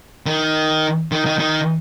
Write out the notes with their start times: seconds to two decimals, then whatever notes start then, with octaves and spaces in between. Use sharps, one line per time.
0.26 D#3
1.12 D#3
1.26 D#3
1.39 D#3